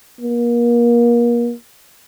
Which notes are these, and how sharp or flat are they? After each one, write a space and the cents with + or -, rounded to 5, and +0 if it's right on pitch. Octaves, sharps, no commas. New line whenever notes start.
A#3 +35